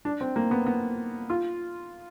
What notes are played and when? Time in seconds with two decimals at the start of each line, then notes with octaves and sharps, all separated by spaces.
0.05 D4
0.21 C4
0.36 A#3
0.51 B3
0.66 B3
1.30 F4